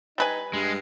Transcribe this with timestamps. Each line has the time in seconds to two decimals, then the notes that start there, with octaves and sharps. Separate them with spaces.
0.18 G3 D#4 B4 G#5
0.53 G2 G#3